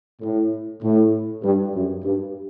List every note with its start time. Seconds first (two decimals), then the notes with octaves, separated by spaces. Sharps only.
0.21 A2
0.82 A2
1.43 G2
1.74 F#2
2.04 G2